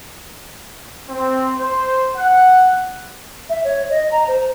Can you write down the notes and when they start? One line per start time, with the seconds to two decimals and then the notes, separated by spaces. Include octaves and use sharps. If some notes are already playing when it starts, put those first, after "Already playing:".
1.10 C4
1.60 C5
2.17 F#5
3.50 E5
3.64 C#5
3.90 D#5
4.12 A#5
4.28 C5